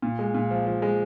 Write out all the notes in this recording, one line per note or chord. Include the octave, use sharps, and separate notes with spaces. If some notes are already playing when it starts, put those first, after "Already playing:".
A#2
G#3
A#2
F3
F3
G#3